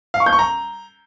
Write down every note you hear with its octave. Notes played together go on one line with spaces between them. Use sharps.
F5
C#6
G6
C#6
A#5